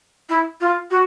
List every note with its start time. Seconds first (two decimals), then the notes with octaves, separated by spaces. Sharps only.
0.29 E4
0.61 F4
0.91 F#4